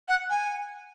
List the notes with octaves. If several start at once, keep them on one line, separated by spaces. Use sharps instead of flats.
F#5
G#5